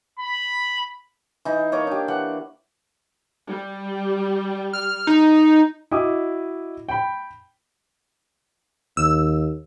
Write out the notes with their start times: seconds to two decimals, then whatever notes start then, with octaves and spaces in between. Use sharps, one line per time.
0.19 B5
1.45 E3 D#4
1.72 A#3 C#5 D#5 D6
1.87 D4 G4
2.08 E3 F#5
3.48 G3
4.73 F6
5.07 D#4
5.91 E4 F#4 D#5 D6 D#6
6.89 G5 B5
8.97 D#2 E6